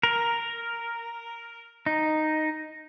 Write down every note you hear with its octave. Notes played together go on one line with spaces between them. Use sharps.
A#4
D#4